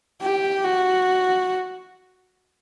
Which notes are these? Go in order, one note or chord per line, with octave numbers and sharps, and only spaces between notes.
G4
F#4